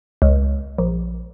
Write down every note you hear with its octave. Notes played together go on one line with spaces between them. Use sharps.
C#2
A#1